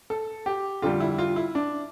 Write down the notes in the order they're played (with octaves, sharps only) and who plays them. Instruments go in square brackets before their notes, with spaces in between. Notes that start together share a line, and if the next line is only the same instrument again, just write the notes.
[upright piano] A4
G4
F2 D3 G3 F4
E4
F4
E4
D4